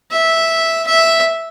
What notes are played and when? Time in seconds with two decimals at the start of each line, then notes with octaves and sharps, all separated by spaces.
0.12 E5
0.87 E5